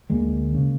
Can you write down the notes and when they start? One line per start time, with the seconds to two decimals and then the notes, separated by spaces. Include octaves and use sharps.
0.10 D2 D3 G#3 A#3
0.54 C#3